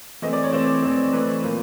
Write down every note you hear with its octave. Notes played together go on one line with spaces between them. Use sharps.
E3 A3 C4 D#5
D5
C#5
E3 A3 C4 C5
E3 A3 C4
E3 A3 C4 B4
A#2 F3 A#3